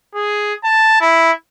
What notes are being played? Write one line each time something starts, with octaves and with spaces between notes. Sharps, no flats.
G#4
A5
E4